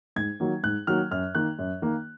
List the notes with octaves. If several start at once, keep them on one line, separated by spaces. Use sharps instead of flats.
G#2 G#6
D#3 F#3 A#3
G#2 F#6
D#3 F#3 A#3 F6
F#2 F6
D#3 A#3 F#6
F#2
D#3 A#3